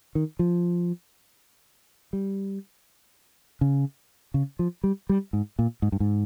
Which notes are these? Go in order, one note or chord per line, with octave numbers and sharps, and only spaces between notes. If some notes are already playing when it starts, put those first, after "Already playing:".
D#3
F3
G3
C#3
C#3
F3
G3
G3
G#2
A#2
G#2
G2
G#2